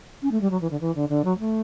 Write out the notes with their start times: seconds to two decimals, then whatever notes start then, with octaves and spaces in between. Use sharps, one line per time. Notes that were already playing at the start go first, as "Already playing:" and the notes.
0.22 C#4
0.31 A3
0.41 G3
0.50 F#3
0.60 E3
0.70 D3
0.80 E3
0.95 D3
1.09 D3
1.24 F#3
1.38 A3